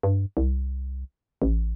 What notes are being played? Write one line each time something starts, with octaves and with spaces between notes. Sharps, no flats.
G2
C2
A1